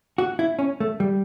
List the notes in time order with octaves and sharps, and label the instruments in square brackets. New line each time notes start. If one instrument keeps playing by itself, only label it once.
[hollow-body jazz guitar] F#4
E4
C#4
A3
G3